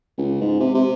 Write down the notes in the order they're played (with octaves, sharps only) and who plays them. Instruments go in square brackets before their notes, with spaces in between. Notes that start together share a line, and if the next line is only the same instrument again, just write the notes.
[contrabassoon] C#2
G#2
C3
C3